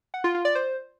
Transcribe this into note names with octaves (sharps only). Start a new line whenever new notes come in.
F#5
F4
F4
D5
C5